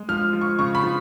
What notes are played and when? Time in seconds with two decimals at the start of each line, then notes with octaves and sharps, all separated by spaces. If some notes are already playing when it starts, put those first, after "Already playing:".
Already playing: G#3
0.09 F3 F6
0.33 F3
0.41 C#6
0.59 C#3 C#6
0.75 B5
0.84 F3